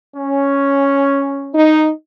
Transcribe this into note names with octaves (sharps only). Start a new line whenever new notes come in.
C#4
D#4